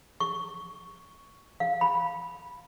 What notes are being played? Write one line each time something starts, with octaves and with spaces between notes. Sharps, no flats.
C#6
F5
B5